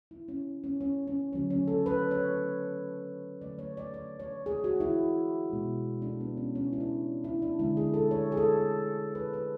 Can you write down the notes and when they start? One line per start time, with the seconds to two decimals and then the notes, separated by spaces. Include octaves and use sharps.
0.11 E4
0.28 C#4
0.64 C#4
0.81 C#4
1.07 C#4
1.33 D3 F#3 A3 C#4
1.50 C#4
1.67 A4
1.86 B4
2.11 C#5
3.41 D3 F#3 A3 D5
3.59 C#5
3.77 D5
3.94 D5
4.20 C#5
4.46 G#4
4.64 F#4
4.80 E4
5.50 B2 G#3
6.02 D4
6.21 B3
6.37 C#4
6.55 C#4
6.73 E4
6.80 D4
7.24 E4
7.42 D4
7.59 D3 G#3 E4
7.77 G#4
7.94 A4
8.11 C#5
8.32 G#4
8.37 A4
9.15 B4
9.33 B4